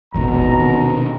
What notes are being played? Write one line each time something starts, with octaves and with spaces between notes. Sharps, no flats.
D#1 G#1 E2 B2 A#5
C3 D#3